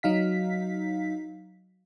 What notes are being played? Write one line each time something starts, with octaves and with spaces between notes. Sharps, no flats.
F#3 D#4 F5 B6